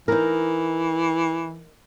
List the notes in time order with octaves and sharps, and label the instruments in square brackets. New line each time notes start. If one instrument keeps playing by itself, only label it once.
[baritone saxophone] E3 [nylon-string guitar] D#4 A#4